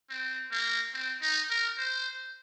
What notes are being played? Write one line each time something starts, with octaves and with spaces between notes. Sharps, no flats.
C4
A#3
C4
D#4
A#4
C5